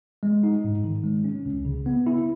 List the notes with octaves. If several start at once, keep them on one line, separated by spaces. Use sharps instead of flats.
G#3
D#4
G#2
D#3
G#3
C#4
C#2
C#3
B3
E4